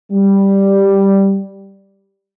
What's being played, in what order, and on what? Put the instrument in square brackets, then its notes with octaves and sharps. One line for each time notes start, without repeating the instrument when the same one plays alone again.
[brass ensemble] G3